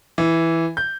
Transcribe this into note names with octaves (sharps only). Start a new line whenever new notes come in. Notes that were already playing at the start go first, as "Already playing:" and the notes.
E3
G6